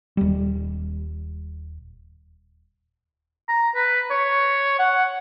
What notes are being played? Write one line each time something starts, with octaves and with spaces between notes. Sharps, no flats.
D#1 G3
A#5
B4
C#5
F#5